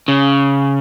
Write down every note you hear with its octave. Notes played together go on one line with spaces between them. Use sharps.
C#3